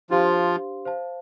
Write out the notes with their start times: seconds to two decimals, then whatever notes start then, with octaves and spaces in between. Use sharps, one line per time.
0.10 F3 D4 F4 G4 C5 F5 C6
0.85 C5 F5 A5